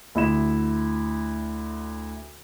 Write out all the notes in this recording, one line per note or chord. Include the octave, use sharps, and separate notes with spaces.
D2 E4 E7